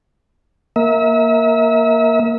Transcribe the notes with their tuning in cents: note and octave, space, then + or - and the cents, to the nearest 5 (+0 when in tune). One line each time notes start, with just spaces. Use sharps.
A#3 +0 E5 -35